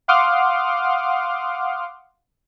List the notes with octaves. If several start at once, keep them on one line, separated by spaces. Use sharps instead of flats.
F5 F#5 C6 D6 D#6 F6